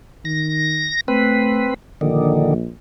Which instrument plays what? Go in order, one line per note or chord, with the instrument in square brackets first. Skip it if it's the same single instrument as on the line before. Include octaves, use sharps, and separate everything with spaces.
[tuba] D#3 [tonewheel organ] A#6
[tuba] A3 [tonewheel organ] C4 B4
[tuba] A#1 [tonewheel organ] D3 D#3